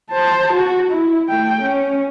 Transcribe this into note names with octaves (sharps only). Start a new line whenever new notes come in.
C5 A5
F#4
E4
A3 G5
C#4